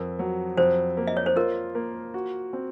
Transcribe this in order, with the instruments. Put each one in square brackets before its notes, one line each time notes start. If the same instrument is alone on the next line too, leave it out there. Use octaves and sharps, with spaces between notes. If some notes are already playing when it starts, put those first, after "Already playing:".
Already playing: [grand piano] F2 [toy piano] A#4
[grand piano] F#3
[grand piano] F2 [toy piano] C5
[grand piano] A#3
[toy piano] D#5
C#5
C5
[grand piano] F4 [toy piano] A#4
[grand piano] A#3
F#4
C4